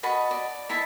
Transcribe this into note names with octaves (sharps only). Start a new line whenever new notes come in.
F#4 D#5 A5 B5
D5
D#4 E4 E5 A5